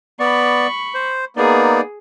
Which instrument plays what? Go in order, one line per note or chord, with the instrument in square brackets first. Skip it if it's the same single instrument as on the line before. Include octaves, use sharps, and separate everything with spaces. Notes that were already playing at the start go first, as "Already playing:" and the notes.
[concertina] B3 D5 [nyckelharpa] B5 C#6
[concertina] C5
[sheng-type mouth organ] A#3 B3 [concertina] D#4 D5 [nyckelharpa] G#4